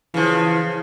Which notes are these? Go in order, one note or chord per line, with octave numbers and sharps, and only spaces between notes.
C#3 E3 F3